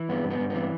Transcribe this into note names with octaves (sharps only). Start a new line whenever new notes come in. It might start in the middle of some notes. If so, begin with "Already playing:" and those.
Already playing: E3
G2 B3
G2
B3
G2
E3 B3